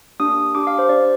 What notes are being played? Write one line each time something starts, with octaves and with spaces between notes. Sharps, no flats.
A#3 D4 G4 D#6
D4 G4 D6
F5
C5
D4 G4 D5